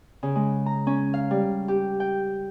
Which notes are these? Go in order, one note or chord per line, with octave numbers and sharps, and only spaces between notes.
C#3
G#3
A#5
C#4
F5
G3
G4
G5